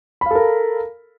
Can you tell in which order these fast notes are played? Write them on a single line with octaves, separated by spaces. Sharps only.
B5 F5 A4 A#4